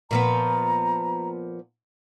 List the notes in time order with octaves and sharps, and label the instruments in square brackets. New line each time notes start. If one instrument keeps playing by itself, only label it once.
[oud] A#2 F3 B3 [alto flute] A#5